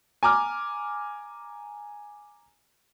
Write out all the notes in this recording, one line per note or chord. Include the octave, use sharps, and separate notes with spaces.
G#5 A#5 D6 F6